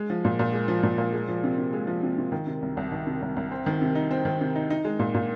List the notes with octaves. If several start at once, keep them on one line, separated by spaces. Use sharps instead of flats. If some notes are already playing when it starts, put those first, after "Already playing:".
Already playing: G#3
F3
A#2
A#2
G#3
F3
A#2
A#2
G#3
F3
C3
C3
G#3
F3
C3
C3
D#3
C3
C2
C2
D#3
C3
C2
C2
C4
D#3
C3
D#4
C4
D#3
C3
D#4
D#4
G#3
A#2
A#2